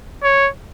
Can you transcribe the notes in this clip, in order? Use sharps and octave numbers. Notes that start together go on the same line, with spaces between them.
C#5